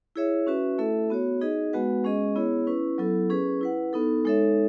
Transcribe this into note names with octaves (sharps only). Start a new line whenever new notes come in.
E4 G#4 C#5 E5
C#4 F#4 B4 E5
A3 E4 A4 E5
B3 F#4 C#5
D#4 G#4 D#5
G#3 B3 F#4 B4 F#5
G#3 C#4 G#4 D#5
B3 E4 G#4 C#5
C#4 E4 B4
F#3 B3 E4 A4
C#4 G#4 B4
E4 B4 F#5
B3 D#4 A4
G#3 D#4 A4 C#5 E5